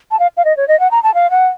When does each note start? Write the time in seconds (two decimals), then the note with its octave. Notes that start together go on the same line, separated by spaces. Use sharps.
0.11 A5
0.19 F5
0.37 F5
0.45 D#5
0.57 C#5
0.68 D#5
0.80 F#5
0.91 A#5
1.03 A5
1.14 F5
1.31 F#5